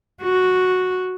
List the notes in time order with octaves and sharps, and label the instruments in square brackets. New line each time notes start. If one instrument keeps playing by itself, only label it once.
[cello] F#4